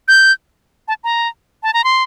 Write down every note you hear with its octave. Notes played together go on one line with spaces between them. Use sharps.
G6
A5
A#5
A5
A#5
C6